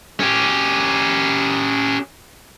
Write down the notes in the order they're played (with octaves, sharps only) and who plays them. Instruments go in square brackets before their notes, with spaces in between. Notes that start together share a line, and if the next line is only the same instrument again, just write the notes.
[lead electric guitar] C#4 G4